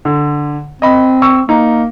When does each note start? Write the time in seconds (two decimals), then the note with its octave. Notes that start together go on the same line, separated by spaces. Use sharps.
0.05 D3
0.82 C4 D#5 B5
1.22 C#6 E6
1.49 A#3 D#4